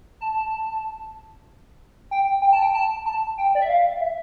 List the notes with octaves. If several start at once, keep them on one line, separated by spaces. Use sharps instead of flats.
A5
G5
G5
A5
G5
A5
A5
G5
D5
E5
F5
E5